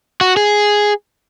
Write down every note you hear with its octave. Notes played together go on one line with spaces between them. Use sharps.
F#4
G#4